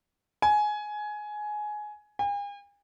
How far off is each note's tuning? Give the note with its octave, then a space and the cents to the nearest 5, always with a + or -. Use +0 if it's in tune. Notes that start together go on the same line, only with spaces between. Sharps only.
G#5 +15
G#5 -45